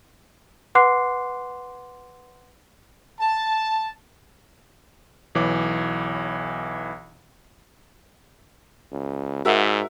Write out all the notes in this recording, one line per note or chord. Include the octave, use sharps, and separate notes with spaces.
B4 F#5 C6 D6 F#6 C7
A5
B1 E3 C#5 D6
C#2
G#2 F#4 A#4 E5